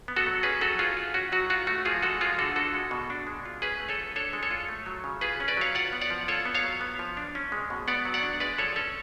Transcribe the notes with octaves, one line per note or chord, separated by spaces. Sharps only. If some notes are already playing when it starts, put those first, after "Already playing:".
B3
F#4 A4
F#3
C#4 G#4 B4
F#3 F#4 A4
F4 G#4
F4
C#4 F#4
F#3 F#4
F4 F#4
A3 F#4
F3 F4 G#4
G#3 F#4 A4
F3 F4 G#4
D3 F#4 A4
D4 F#4 A4
G#3
B2
D4
G#3
F4
C#4 G#4 B4
A3
A4 C#5
F4
D4 A4 C#5
G#3
A4 C#5
F4
A3
F#3
C#3
F4 G#4 B4
C#4
B4 D5
F#3 C#5 F5
F4 D5 F#5
B3
D5 F#5
F3
F4 A4 C#5
B3
C#5 F5
F#3
B3
F3
D4
C#4
G#3
B2
B3 D5 F#5
F#3
D5 F#5
D4
G#3 B4 D5
F3 A4 C#5
C#4 A4 C#5